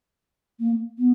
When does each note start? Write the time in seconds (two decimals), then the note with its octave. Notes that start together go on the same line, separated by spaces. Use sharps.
0.59 A#3
0.99 B3